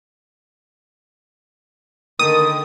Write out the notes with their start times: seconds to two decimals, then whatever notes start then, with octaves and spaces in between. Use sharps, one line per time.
2.19 D3 D#3 D#6